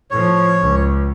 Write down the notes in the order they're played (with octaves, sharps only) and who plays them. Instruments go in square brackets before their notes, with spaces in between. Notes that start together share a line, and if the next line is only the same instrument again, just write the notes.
[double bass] A2 F3 [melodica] C#5
[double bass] C#2